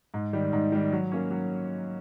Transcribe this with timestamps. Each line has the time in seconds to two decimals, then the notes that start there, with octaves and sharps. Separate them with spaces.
0.14 G#2
0.33 D#3 G3
0.53 G#2
0.72 D#3 G3
0.92 F#3
1.12 A#3 C#4
1.31 F#3